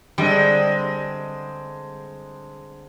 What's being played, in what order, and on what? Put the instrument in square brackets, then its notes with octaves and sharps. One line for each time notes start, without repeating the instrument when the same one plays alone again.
[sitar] D3 G#3 C4 [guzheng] G3